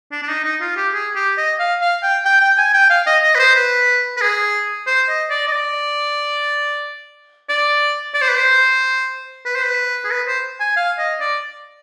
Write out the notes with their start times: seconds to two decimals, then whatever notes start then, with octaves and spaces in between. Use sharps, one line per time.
0.12 D4
0.22 D4
0.28 D#4
0.44 D#4
0.61 F4
0.77 G4
0.93 G#4
1.15 G4
1.37 D#5
1.59 F5
1.81 F5
2.03 G5
2.25 G5
2.41 G5
2.57 G#5
2.73 G5
2.90 F5
3.06 D#5
3.23 D#5
3.35 B4
3.39 C5
3.55 B4
4.17 B4
4.21 G#4
4.87 C5
5.08 D#5
5.30 D5
5.47 D#5
5.52 D5
7.49 D5
8.14 D5
8.21 C5
8.29 B4
8.36 C5
9.45 B4
9.55 C5
9.65 B4
10.04 G#4
10.11 B4
10.27 C5
10.60 G#5
10.76 F5
10.98 D#5
11.20 D5